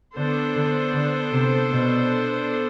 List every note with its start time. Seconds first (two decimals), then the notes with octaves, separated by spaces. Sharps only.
0.17 D3 B3 D4 A4 C5
0.55 D3
0.94 D3
1.33 C3
1.71 B2